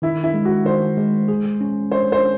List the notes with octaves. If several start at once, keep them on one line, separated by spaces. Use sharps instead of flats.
D#3 E4
E4
G#3
F#4
D#3 C5
G#3
G#4
C#4
C5 C#5
C5